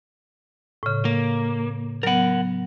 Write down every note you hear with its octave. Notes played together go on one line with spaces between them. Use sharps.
A2 C#3
A#3
F#3 B3 A#4 F#5